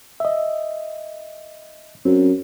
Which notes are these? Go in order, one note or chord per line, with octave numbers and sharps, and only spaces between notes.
D#5 E5
F#2 C4